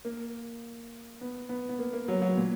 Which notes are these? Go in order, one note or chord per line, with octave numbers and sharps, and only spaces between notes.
A#3
B3
B3
B3
A#3
A#3
F#3
F#3
A#2